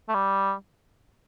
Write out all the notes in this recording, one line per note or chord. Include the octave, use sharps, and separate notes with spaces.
A3
G3